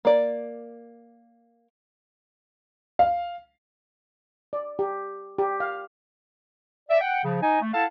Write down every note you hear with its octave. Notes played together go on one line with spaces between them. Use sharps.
A#3 D5
F5
D5
G4
G4
F5
D5 E5
F#5 G5
C#3 F3
D#4 D#5 G#5
A3
E4 A4 F5 F#5 A5